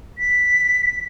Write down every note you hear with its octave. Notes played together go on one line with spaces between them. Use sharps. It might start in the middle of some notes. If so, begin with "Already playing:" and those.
B6